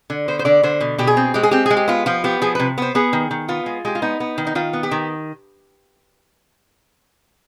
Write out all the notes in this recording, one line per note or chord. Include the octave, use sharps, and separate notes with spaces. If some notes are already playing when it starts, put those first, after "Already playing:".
D3
B3 C5
C5
D3 D5
D3 C5
B2
B2 G4
G#4
C4
G#3 G4
G#4
C4 G4
G#3 G#4
G4
B3 F4
F3 F4
B3 G4
F3 G#4
C3 B4
B3 C5
B3 G#4
D#3
D#3
B3 F4
G#3
G#3 G4
F4
B3 D#4
B3
D#3
D#4
D#3 F4
B3
G4
D#3